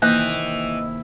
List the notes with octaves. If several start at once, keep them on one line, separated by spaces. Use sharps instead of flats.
C3 D#3 E3 A#3 D#5 F#6 G6